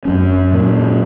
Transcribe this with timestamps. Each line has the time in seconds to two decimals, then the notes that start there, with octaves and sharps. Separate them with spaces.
0.05 F#2 F#3 C#4
0.53 A#2 F#3 C#4